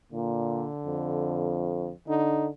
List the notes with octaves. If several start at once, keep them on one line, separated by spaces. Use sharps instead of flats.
A#2 D3
F2
D3 D#4